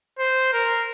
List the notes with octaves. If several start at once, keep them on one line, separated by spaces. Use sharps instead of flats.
C5
A#4